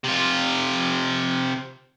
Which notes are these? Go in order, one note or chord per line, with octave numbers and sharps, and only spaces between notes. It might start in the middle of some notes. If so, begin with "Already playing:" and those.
C3 F4